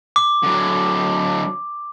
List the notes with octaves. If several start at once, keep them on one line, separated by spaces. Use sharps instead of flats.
D6
D3 F#3